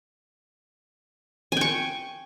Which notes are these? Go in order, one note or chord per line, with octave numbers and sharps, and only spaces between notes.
G5 G#5 C#6